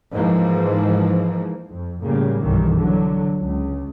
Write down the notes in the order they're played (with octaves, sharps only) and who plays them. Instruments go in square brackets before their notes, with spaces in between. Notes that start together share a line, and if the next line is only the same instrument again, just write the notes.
[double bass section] G#2 E3 F3 A#3
F2
A2 C#3 G3 A#3
B1 G2 D#3 E3
D3 F#3
C#2